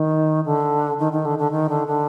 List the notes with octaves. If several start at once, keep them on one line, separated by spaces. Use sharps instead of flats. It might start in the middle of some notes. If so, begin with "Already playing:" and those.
Already playing: D#3
D3
D#3
D#3
D3
D3
D#3
D3
D3